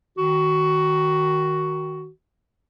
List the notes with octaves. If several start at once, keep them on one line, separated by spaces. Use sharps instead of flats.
D#3 F#4